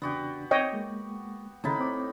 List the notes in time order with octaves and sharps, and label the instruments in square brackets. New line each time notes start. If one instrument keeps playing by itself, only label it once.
[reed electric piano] E2 C#3 D4 [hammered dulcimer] B3 F#4 G4
[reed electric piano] C4 [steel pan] C#5 D#5 G5
[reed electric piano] G#3 A#3
[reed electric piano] D#2 C#3 A6 [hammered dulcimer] A2 D#4 B5
[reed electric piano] C4 D6